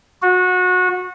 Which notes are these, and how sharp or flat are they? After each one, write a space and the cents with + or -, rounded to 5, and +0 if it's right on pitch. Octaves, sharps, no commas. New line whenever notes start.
F#4 -25